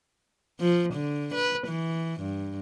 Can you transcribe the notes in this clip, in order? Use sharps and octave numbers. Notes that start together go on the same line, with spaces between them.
F3
D3
B4
E3
G2